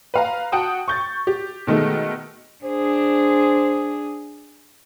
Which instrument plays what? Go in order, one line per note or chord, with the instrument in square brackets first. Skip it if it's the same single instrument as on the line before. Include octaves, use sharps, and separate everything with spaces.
[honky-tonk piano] B4 F5 A#5
F#4 F#5 G5 A5 D#6
C#6 G6 A6
G4
B2 D#3 G#3 A3
[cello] D4 G#4 [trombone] C5